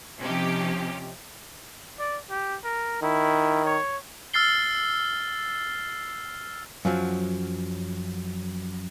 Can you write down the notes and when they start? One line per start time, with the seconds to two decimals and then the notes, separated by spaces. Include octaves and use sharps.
0.20 C3 F3 C#4 D#4 G4
1.99 D5
2.30 G4
2.64 A#4
3.02 D#3 E4
3.65 C#5
4.34 E6 F6 A6 C7 G7
6.85 F#2 F3 F#3